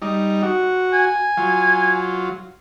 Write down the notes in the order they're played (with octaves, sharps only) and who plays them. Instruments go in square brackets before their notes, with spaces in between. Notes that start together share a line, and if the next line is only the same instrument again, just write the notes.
[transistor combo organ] G3 D#4
F#4
[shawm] G#5
[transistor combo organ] F#3 F4